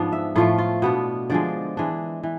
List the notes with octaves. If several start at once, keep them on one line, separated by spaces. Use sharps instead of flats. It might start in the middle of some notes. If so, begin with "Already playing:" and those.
Already playing: G#2 F3 B3 D4
E5
A2 F3 A3 F4
F4
B2 B3 D4
D3 F3 G#3 D5
E3 G#3 D4
E3